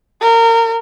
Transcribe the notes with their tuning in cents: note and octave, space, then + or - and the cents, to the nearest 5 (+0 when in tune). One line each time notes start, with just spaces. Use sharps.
A#4 -25